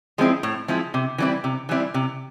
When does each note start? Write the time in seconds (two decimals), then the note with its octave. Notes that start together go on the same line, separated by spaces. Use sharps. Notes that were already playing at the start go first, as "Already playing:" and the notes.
0.18 F3 G#3 C4 E4
0.43 A2
0.68 F3 G#3 C4 E4
0.94 C3
1.18 E3 G3 C4 E4
1.44 C3
1.69 E3 G3 C4 E4
1.94 C3